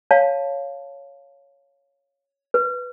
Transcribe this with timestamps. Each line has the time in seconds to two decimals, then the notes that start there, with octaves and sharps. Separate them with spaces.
0.11 C#5 F5 A5
2.54 B4